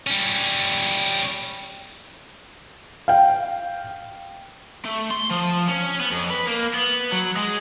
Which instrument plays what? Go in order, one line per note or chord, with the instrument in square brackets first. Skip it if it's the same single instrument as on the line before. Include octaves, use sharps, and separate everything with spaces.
[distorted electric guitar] G3 C#4
[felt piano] F5 G5
[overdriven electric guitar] A3
C6
F3
C#4
B3
F2
B4
A#3
B3
F#3
G#3